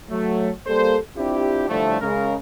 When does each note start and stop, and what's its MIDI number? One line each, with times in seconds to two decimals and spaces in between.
0.10 0.50 54
0.10 0.50 57
0.67 0.97 55
0.67 0.97 58
0.67 0.97 69
0.67 0.97 72
1.17 1.66 60
1.17 1.66 62
1.17 1.66 64
1.17 1.66 65
1.17 1.66 67
1.69 1.96 45
1.69 1.96 50
1.69 1.96 53
1.69 1.96 55
1.69 1.96 57
2.01 2.35 49
2.01 2.35 56
2.01 2.35 70